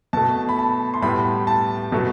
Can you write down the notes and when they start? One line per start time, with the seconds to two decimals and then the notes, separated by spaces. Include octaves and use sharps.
0.13 B2 A3 A5
0.49 B5
0.59 A5
0.94 C6
1.02 A2 G3 B3 B5
1.47 A5
1.92 B2 F#3 A3